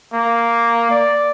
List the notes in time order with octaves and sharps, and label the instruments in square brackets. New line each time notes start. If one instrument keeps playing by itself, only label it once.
[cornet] A#3
D5